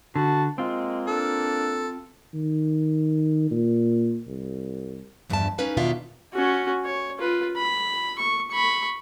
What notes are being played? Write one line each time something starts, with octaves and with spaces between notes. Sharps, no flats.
D3 F#4 A5
G#3 A#3 C4 F4
D4 A4
D#3
A#2
C2
E2 G2 C#3 F3 E5 A5
C#4 D#4 B4 F5
E2 B2 D#3 D4 F4 E5
C#4 F#4
C#5
F4 B4
B5
C#6
B5 C#6